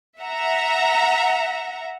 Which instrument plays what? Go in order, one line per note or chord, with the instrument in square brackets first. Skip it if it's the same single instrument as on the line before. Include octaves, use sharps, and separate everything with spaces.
[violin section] E5 F#5 A#5